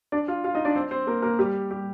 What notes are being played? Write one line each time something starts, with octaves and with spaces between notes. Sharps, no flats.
D4 D5
F4 F5
F4 F5
D#4 D#5
D4 D5
C4 C5
C4 C5
A#3 A#4
A#3 A#4
G3 G4
G3 G4